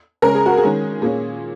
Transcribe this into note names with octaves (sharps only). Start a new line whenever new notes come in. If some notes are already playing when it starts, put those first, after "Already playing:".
C#3 G#3 C#4 A#4
G#4
F#4
G#4
D#3 G#3 C#4
A#2 A#3 C#4 G#4